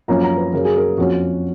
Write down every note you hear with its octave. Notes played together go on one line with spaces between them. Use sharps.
F#2 F3 A#3 C#4 A#5
A#5
B4
F#2 C#3 F#3 C#4 A#4
G#4
A#4
F2 F3 A#3 C#4 F#4